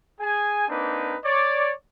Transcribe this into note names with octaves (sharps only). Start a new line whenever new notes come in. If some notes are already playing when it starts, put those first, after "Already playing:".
G#4 G#5
A#3 C4 D4 D#4 B4
C#5 D5